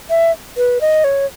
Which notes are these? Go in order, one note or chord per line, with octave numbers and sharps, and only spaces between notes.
E5
B4
D#5
C#5